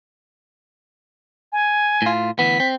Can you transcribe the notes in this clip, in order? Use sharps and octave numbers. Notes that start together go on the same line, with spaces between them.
G#5
A2 F4
D2 E3 B3 B6
C4